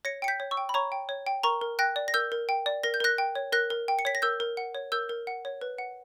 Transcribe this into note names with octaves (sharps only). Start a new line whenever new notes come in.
C#5 A#6 C#7
G5 C#7
G6 B6
C#5
C#6 E6
G5
B5
C#5 A#5 C#6
G5
C#5
G5
A#4 A#5 C#6
A#4
G5 F#6 A#6
D5
A#6
A#4 E6 G6
A#4
G5
D5
A#4 A#6
G6
A#4 F#6 A#6
G5
C#5
A#4 F#6 A#6
A#4
G5
C#7
C#5 B6
A#6
A#4 E6 G6
A#4
F#5
C#5
A#4 E6 G6
A#4
F#5
C#5
B4
F#5